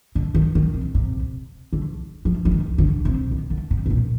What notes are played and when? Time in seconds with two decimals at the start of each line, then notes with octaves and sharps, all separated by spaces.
0.15 D3
0.34 D#3
0.55 D#3
0.74 C3
0.95 C3
1.73 D3
2.25 F3
2.45 F3
2.51 D#3
2.78 D3
3.05 C3
3.31 D#3
3.50 D3
3.71 C3
3.86 C3
3.90 A#2